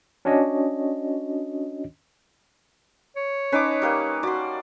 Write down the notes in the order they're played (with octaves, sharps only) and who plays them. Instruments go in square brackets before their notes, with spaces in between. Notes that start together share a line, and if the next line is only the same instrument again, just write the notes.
[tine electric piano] C#4 D4 F#4 C#5 D#5
[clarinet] C#5
[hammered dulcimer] C#4 D#4 A5 [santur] B4 D6
[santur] G3 A#3 B4
[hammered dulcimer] F#4 [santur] D5 C6